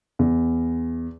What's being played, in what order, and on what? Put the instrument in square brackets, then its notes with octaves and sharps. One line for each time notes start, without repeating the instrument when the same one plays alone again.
[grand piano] E2